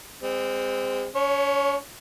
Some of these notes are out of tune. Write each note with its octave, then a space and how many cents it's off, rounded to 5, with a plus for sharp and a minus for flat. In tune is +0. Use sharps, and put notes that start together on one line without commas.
G#3 -40 C4 -15
C#4 +35 C#5 +0